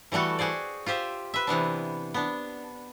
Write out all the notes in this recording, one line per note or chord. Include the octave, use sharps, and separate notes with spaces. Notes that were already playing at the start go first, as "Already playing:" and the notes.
E3 G3 A3 F#4 A4
F#4 G#4 C5 D5
F4 G4 C5 E5
B4 E5
C3 E3 B3 D4
B3 D4